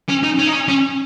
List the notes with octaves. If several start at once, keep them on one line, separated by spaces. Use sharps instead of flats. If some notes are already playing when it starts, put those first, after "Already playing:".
C#4
D#4
C#4
D#4
C#4
C#4